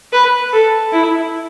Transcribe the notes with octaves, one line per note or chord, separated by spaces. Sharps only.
B4
A4
E4